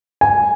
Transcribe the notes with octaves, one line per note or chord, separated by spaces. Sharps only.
G#5